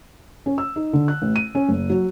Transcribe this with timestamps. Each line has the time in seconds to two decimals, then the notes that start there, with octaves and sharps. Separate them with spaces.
0.46 C#4
0.58 E6
0.76 D#4
0.93 D3
1.08 F#6
1.22 A1
1.36 D#7
1.55 C#4
1.69 F#1
1.90 F#3